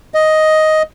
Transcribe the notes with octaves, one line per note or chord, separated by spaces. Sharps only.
D#5